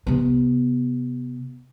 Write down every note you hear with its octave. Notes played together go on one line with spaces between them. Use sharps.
C3 B3